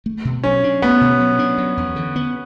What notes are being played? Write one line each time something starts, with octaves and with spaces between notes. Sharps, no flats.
A3
B2
F#3 C#4
D4
A3 B3
B2
F#3
D4
F#3
E2
D3
B3